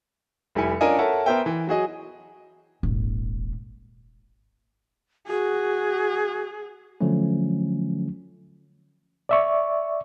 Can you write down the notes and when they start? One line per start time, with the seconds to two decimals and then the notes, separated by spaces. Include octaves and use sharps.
0.55 F1 G3 E4 G#5 C#7
0.81 C#4 D4 F4 A#4 D#5 G#5
0.99 A4 A#4 C#5 E5 F#5 A5
1.26 B3 A#4 C5 E5 G5
1.46 E3
1.67 F#3 F#4 G#4 D#5
2.83 D#1 G#1
5.28 F#4 G#4
7.01 D3 F3 F#3 A3 C#4
9.29 D5 E5 C#6